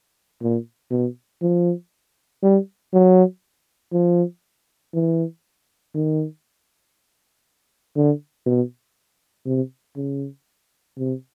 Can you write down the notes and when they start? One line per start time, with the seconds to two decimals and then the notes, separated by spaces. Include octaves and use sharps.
0.42 A#2
0.91 B2
1.42 F3
2.42 G3
2.93 F#3
3.93 F3
4.94 E3
5.94 D#3
7.96 D3
8.46 B2
9.46 C3
9.96 C#3
10.97 C3